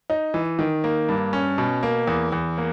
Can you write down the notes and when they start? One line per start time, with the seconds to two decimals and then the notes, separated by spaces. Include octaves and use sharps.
0.10 D#4
0.34 E3
0.59 D#3
0.84 A#3
1.09 G2
1.33 C#4
1.58 B2
1.83 A#3
2.07 E2
2.32 E2
2.58 A#3